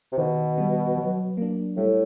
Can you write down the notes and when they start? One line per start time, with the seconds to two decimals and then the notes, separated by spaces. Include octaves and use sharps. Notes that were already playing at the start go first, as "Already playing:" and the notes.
0.12 C3
0.18 B2 D#3
0.58 G3 B3
0.98 F#3
1.37 A#3 D4
1.77 A2 G3